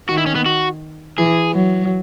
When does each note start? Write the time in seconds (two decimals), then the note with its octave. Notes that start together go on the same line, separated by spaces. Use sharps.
0.09 D#3 F#4
0.18 E4
0.26 C#4
0.35 B3
0.46 F#4
1.18 E3 G#4
1.54 F#3